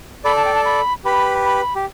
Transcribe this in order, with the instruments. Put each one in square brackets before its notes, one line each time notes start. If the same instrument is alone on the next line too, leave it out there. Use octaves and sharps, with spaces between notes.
[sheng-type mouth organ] A4 D5 [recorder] B5
[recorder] A5
G5
A5
B5
[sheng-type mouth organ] G4 B4 [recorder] B5
[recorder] B5
[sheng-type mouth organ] G4